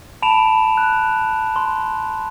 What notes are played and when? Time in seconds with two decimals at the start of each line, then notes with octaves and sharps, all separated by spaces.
0.22 A5 B5 D7 E7 F7
0.77 F#6
1.56 C6